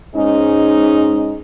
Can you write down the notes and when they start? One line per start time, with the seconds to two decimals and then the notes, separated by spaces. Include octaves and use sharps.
0.15 G#2 G#3 C#4 D#4